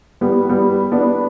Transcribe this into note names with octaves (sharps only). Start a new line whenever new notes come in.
G3 B3
G3 B3
B3 D4